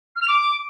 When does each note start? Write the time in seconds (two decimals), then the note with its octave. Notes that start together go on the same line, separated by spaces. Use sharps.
0.16 F6
0.22 F7
0.28 D6